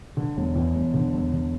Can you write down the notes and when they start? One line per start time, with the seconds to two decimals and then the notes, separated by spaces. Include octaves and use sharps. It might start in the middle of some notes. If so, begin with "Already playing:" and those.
0.17 D3
0.37 E1
0.56 E2
0.75 E1
0.94 D3
1.13 E1
1.33 D3